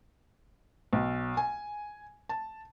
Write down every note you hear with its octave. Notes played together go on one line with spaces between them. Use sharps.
B1
G#5
A5